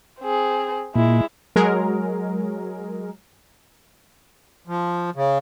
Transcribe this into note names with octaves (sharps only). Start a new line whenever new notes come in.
C4 G#4
A#2 G#3 E4
F#3 G#3 G#4 A#4
F3
C#3